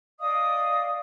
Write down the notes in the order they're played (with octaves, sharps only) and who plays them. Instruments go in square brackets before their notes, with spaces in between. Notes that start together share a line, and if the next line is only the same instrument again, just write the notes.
[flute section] D5 D#5 F5 D#6